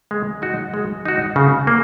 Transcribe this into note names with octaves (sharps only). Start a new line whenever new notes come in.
G#3
D#4 F#4
G#3
D#4 F#4
C#3
A#3